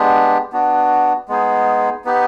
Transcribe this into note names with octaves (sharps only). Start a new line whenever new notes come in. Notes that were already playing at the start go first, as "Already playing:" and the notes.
Already playing: G#3 B3 D4 G4
B3 D4 F#4
G#3 B3 D#4 G#4
B3 D#4 G4 B4